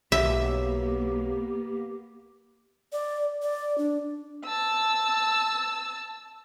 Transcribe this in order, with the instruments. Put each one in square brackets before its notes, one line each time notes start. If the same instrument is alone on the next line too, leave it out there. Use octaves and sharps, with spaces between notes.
[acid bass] B1 [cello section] A#3 B3 [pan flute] G4 [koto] E5
[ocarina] D5
D5
D4
[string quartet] A5 E6